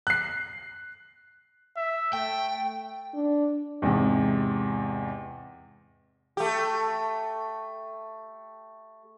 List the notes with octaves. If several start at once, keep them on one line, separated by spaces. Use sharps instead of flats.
F#6 C7
E5
A3 G5
D4
E2 G#2 C3
A3 G4